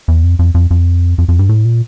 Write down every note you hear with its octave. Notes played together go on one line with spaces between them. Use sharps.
E2
F2
F2
F2
F2
F2
F2
G2
A2
A#2